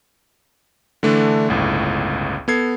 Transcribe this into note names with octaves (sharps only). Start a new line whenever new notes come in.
D3 E3 A3 D4
G1 C#2 A2
B3 A4 G#6 C7